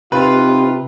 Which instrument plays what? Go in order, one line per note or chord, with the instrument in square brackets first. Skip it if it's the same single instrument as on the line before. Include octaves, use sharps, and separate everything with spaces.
[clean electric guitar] C3 [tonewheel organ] C4 D#4 G4 [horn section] F4 [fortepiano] B4